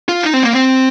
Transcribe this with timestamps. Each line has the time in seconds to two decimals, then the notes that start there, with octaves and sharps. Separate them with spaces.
0.09 F4
0.23 D#4
0.34 C4
0.44 A#3
0.53 C4